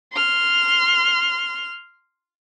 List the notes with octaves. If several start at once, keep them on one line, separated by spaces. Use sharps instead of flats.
C6 F6